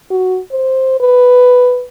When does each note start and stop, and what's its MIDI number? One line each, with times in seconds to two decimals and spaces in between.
0.10 0.39 66
0.52 0.95 72
1.00 1.84 71